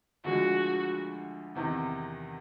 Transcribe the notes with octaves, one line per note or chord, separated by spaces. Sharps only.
D2 D3 F3 G#3 F#4
E2 C3 D#3